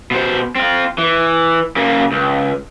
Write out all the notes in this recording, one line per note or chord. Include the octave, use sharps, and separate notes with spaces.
B2 C5
C4 F4
E3
C#3 A#3
C#2